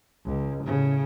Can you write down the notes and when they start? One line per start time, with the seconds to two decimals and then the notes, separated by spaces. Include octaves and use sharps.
0.25 C#2
0.64 A2 C#3